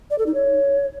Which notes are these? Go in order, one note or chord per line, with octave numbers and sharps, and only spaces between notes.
D5
A4
D#4
C#5